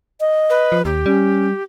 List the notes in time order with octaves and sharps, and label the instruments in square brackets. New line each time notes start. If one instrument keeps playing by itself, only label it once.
[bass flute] D#5
[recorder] B4
[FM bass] F3
[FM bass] D#2 [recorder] G4
[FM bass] G3 [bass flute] C#4